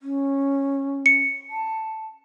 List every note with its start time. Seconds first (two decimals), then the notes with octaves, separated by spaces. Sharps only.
0.01 C#4
1.06 C#7
1.50 A5